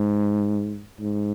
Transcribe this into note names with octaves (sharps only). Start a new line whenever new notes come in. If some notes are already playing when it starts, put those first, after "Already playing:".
Already playing: G#2
G#2